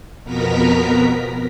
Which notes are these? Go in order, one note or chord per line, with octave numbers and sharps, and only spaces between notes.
F2 B2 B3 A#4 A#5 B6